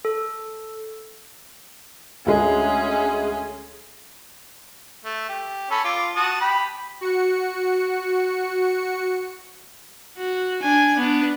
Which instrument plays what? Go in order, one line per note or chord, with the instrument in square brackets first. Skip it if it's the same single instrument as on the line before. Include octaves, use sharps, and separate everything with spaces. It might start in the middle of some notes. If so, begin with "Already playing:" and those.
[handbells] A4
[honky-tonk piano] D2 G#3 [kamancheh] C#4 G#4
[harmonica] A3
G4
C#4 A4 B5
F4 D6
F#4 A5 D#6
G4 B5
[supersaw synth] F#4 C#7
[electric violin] F#4
D4 G#5
B3 D4